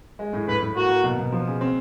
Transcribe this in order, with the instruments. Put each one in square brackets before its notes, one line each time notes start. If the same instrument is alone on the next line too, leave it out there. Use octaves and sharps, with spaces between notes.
[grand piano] G#3
A2
[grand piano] A2 [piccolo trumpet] B4
[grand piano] A2
[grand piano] A#3 [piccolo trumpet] F#4
[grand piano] A#3
B2
B2
F3
C#3
C4